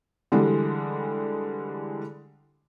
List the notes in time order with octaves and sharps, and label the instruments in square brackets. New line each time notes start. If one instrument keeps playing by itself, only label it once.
[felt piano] D3 E3 G3 G#3